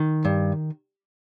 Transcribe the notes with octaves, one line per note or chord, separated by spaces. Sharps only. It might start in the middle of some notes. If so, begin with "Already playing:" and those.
Already playing: D#3
G2